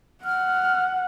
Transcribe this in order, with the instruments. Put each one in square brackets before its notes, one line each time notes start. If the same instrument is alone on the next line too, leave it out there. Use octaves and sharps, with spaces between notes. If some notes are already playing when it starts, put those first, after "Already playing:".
[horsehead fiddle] F#5 [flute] F6